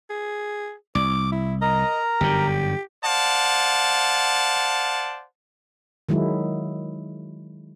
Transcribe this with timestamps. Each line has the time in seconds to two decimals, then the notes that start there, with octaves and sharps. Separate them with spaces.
0.10 G#4
0.95 C2 D6
1.32 E4
1.62 A#4 D#5 A#5
2.21 G1 F#2 D3 G4
3.04 C5 D5 F5 F#5 A5
6.09 D#3 F#3 G#3 E4